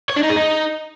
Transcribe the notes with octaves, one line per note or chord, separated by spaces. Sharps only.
C#5
D4
D#4
G#4
D#4